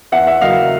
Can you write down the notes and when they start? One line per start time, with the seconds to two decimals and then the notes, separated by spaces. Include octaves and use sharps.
0.12 E2 E5 F#5
0.27 E5 F#5
0.41 C#3 F#3 A#3 D#5 F5